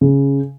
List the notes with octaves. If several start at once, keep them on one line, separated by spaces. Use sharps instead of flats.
C#3